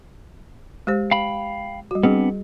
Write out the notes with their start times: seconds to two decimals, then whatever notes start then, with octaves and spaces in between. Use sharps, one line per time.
0.87 G#3 G4 C5
1.11 F5 G5 B5
1.91 G3 F#4
2.03 G3 B3 C4 D4 G#4